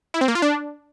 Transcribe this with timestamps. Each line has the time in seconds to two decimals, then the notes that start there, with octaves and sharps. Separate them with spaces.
0.14 E4
0.21 C4
0.28 A#3
0.35 F4
0.42 D4